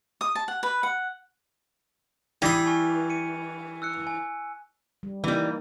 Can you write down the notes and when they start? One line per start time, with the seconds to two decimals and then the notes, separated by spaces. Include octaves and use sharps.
0.21 D#6
0.35 A5
0.48 F#5
0.63 B4
0.83 F#5
2.42 E3 G3 D#6 G#6
2.66 G#5 C#6 F6
3.10 C#7 D#7
3.82 E6 F#6 C#7
4.07 G#5
5.03 G3
5.24 D#3 E3 G3 A#3